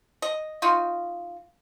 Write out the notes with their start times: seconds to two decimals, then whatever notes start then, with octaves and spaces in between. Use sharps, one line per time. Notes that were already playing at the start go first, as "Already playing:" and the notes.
0.22 D#5
0.62 D#4 F4 F#4